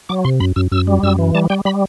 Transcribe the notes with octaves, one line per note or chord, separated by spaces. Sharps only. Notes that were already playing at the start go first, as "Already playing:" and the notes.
F#3 D6
C3 C6
F#2 B5
F#2 E6
F#2 E6
G3
F#2 E6
E3
G3 A5
G3 G5
G3 B5